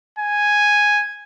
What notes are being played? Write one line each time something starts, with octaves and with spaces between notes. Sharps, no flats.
G#5